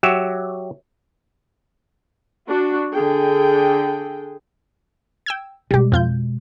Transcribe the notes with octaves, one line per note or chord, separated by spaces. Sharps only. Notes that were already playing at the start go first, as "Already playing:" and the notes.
F#3 F#4 G4 E5
D4 F#4
D3 G#4 G5
G5 E6 G#6
B2 G3 G#3 G4
F2 F4 G6